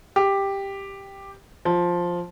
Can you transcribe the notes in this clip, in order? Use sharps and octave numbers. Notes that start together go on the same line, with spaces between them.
G4
F3